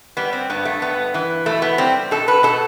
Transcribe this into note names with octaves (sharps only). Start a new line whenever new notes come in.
G3 B3
C4
G2 B3
A3
G2 B3
E3
B2 A3
B3
G3 C4
B2 A4
B4
B2 A4